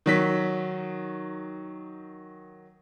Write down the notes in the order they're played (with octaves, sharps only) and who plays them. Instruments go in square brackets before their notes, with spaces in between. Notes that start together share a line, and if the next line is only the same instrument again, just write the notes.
[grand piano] D#3 F#3 B6